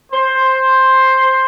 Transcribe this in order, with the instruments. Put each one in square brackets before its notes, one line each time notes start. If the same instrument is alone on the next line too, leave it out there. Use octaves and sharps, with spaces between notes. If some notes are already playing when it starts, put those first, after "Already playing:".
[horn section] C5